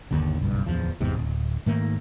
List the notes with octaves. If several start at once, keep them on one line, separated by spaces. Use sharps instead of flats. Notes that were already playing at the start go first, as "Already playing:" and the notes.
G1 D#2 D3
F#1 B1 G2
D1 B1 E2 F3
G1 E2 G#2 C3
D1
G#2 D#3 A3 A#3